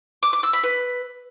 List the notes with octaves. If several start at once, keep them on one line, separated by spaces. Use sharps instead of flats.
D6
D6
E6
B5
B4